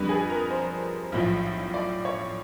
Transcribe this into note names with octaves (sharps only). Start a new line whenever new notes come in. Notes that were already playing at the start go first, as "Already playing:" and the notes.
Already playing: F2 D3 G3 B4
G#4
A#4
C5
B1 A2 F3
D5
C#5